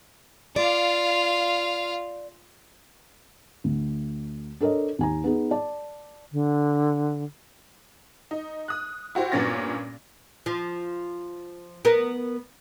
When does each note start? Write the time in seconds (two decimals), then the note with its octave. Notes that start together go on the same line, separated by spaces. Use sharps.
0.56 F4 D5 F5
3.64 D2
4.61 D4 A4 A#4 C#5 D#5
4.99 D#2 G#5 A#5
5.24 B3 D#4 G#4
5.51 D5 A5
6.32 D3
8.31 D#4
8.68 D#6 F#6
9.15 E4 F#4 G4 C5
9.32 G2 A#2 B3 C#4 A6 A#6
10.46 F3
11.85 B3 A#4